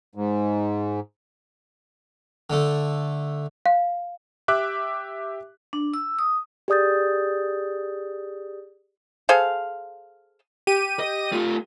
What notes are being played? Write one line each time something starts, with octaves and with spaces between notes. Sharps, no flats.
G#2
D3 A3
F5
G4 E5 D6 F#6
D4
E6
D#6
G4 G#4 D5 D#6 G6 A6
G#4 A4 C5 F5
G4 D#7
D#5
A3 F4